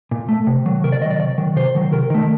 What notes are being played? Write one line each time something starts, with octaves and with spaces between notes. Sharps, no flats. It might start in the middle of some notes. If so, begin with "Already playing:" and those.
A#2
A3
C3
D#3 F#3
C3 A#4
D5
D#3 F#3 D5 D#5
C3 D5
D#3 F#3
C3 C5
D#3 F#3
C3 A#4
D#3 A3